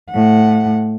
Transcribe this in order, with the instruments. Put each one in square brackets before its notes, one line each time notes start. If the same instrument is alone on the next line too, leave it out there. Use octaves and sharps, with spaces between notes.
[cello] A2 F#5